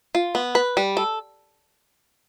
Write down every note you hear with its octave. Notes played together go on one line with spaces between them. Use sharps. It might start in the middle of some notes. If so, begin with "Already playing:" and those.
F4
B3
B4
G3
A4